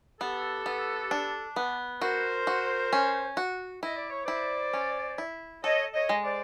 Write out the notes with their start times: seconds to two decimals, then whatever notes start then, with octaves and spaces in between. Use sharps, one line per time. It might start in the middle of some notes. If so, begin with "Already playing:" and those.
0.21 B3 G4 A4
0.66 B3
1.11 D4
1.56 B3
2.02 F#4 A#4 C5
2.47 F#4
2.93 C#4
3.37 F#4
3.83 E4 D#5
3.96 D5
4.10 C#5
4.25 E4 C5 D5
4.73 C#4
5.18 E4
5.64 A4 C#5 D#5
5.94 C#5 D#5
6.09 G#3
6.24 C5 D5